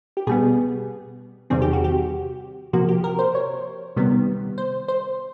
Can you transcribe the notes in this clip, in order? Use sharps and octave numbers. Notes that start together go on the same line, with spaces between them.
G4
B2 G3 B3 G#4
E2 C3 D#3 G3 C4 G#4
G4
F#4
G4
C3 F3 A#3 F#4
G4
A#4
C5
C#5
C3 D#3 G3 B3
C5
C5